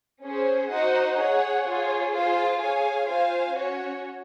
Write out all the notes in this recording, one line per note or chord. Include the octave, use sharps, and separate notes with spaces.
C#4 G#4 C5
D#4 F#4 C5 D#5 F#5
G#4 C#5 F#5
F4 G#4 C#5
F4 G#4 C5 F5
G#4 C#5 F5 G#5
F4 C5 F5 G#5
C#4 F#4 C#5